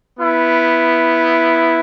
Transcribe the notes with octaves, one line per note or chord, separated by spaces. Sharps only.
B3 E4